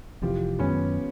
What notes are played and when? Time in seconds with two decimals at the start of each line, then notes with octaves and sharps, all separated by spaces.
0.22 F1 F2 C3 E3 F4 G4
0.59 F#2 D#3 G#3 B3 C#4